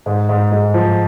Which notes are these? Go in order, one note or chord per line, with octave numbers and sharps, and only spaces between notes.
G#2
G#2
G#3
F3